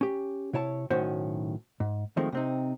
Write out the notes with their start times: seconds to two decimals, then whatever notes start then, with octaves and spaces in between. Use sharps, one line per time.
0.01 C#4 G4
0.53 C3 E4 C#5 A5
0.90 B1 A2 D#3 C#4 F#4 C5
1.80 G#2
2.17 D#3 F3 G#3 A3 C4
2.32 C3 C4 D#4